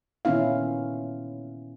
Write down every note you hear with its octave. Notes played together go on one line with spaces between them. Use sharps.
A#2 D#3 B3 C#4 E4 F5